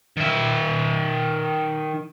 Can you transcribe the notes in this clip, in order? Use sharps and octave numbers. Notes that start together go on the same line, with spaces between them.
D#3 E5